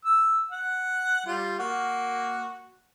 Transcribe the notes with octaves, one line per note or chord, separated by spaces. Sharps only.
E6
F#5
G3 F4
A#3 F#4